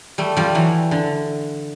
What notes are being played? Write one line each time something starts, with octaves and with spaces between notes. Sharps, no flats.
G3 A3
F3 G3
E3 F#3
D3